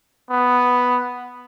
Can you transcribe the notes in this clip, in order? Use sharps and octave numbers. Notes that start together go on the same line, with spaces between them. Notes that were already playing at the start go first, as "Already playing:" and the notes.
B3